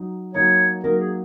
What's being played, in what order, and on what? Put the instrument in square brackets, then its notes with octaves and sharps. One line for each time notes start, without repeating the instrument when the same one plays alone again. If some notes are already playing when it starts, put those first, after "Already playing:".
Already playing: [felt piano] F#3 D#4
[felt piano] F#3 A#3 D#4 [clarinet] C#5
[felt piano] F#3 A#3 D#4 [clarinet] A#4
[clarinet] G#4